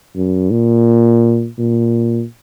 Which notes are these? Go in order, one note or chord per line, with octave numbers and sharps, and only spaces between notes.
F#2
A#2
A#2